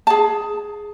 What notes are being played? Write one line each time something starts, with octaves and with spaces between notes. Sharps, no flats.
G#4 A5